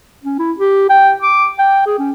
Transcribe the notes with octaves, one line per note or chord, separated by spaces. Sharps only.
C#4
E4
G4
G5
D6
G5
G#4
C#4